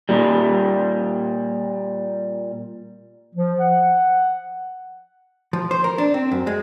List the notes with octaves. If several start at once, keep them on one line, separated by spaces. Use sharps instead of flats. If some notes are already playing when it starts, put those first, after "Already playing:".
A#2 G3
F3
F#5
F3
C5
A#4
D4
C4
F#2
G#3